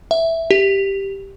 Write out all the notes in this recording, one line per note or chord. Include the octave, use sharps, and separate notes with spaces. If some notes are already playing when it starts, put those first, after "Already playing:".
E5
G4